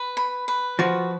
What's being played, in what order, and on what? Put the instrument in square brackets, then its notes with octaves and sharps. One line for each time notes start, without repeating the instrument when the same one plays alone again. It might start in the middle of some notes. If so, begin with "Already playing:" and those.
Already playing: [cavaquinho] B4
B5
B4
[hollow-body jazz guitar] F3 [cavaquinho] F#4